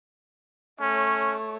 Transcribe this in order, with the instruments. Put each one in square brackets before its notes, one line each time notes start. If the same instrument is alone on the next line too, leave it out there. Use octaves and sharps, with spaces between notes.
[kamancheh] A3 C#5 [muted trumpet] C#4